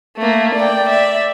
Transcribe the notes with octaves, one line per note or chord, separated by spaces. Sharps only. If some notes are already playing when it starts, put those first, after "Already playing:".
A3 A#3
D5 G5
D5 E5